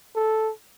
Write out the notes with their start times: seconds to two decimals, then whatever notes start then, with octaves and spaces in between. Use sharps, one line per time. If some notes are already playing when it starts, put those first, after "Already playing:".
0.16 A4